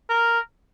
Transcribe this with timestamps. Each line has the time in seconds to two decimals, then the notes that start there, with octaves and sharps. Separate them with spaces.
0.10 A#4